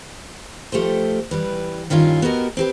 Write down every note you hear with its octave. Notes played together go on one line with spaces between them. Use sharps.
F3 A3 G4 A4 C5
E3 G3 B4
G2 D#3 C#4 E4 F4
B3 F#4 G4 A#4 D#5
C4 G4 B4